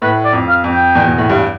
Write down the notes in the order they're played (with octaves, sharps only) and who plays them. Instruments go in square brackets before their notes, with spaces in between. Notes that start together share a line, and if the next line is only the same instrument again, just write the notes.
[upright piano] A2 [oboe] B4
[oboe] D5
[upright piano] F2
[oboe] F5
[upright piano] F2
[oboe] G5
[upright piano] E2
B2
A2
G2